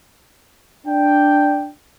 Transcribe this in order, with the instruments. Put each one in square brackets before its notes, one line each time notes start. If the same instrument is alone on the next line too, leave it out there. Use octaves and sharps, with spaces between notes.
[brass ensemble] D4 G5